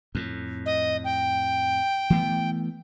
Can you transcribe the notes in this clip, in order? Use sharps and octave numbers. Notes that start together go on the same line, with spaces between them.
F2 A2
D#5
G5
E3 A3 B3